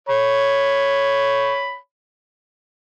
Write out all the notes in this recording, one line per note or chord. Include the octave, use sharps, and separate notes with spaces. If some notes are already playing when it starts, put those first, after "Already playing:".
C#5 B5